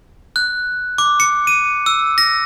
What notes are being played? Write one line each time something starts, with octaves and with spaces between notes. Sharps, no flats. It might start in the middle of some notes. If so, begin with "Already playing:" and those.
F#6
D6
C#7
D#7
E6
A#6